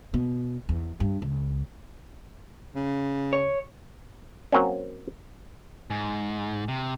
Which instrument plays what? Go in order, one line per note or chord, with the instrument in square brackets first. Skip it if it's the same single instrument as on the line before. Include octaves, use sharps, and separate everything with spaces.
[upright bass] B2
E2
G2
C#2
[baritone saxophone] C#3
[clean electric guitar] C#5
[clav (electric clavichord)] F#3 A#3 C4 C#4
[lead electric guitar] G#2
C3